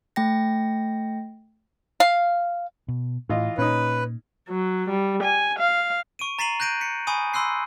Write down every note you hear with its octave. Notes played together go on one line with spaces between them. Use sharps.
A3 G5 A#6
F5
B2
A2 E3 F4 D#5
A#2 C#4 D#4 B4
F#3
G3
G#5
F5
C#6 D7 D#7
A#5 A6 B6 C7 D#7 F#7
F#6 G6 A#6 D7 D#7
B6 C#7
G#5 B5 C#6 D#6 D#7
B5 C6 E6 F#6 C7